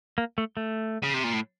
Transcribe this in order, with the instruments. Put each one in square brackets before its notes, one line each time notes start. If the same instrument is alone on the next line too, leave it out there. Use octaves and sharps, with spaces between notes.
[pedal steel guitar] A#3
A3
A3
[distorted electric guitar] C#3
C3
A#2
A2